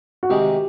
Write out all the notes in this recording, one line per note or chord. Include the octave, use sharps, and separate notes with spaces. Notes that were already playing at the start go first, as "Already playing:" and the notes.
F#4
C2 C3 D#3 G#3 G4